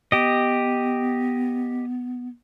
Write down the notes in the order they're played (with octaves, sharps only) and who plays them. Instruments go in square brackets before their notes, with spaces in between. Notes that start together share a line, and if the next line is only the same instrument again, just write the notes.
[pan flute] B3 [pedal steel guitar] G4 D#5